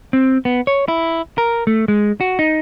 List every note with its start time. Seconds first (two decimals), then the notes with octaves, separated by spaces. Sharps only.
0.13 C4
0.45 B3
0.67 C#5
0.88 E4
1.38 A#4
1.67 A3
1.88 G#3
2.21 F#4
2.39 D#4